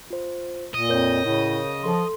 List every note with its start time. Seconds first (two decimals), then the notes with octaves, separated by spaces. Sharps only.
0.10 F4 C5
0.74 A#2 D#5
0.89 F2 A#4 C#5 G6
1.25 A2 C#3
1.83 F3 A4 C6